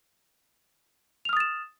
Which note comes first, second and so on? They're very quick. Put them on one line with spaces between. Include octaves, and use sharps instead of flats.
F7 F6 D#6 A6 E7